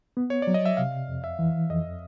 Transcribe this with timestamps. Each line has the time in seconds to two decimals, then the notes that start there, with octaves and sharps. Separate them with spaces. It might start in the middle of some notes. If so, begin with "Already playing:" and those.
0.17 B3
0.30 C#5
0.42 F#3 D5
0.54 D#5
0.66 E5
0.77 C3 F5
1.08 F2
1.24 E5
1.39 E3
1.70 F2 D#5